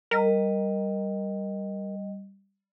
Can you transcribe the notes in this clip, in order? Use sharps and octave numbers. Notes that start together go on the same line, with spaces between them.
G3 A#4 D#5